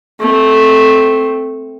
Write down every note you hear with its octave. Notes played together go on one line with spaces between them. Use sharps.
A3 C4